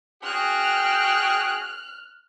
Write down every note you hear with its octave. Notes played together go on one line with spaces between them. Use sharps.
F#4 G#4 G5 F6 F#6